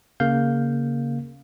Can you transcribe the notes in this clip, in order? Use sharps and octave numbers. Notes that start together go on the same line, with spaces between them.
C#3 A#3 F5 G6